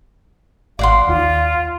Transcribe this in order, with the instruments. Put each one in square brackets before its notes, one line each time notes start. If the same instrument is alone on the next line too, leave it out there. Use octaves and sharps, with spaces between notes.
[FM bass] G#1 [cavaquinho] D5 F#5 C6 [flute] F5
[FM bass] D#2 [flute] F4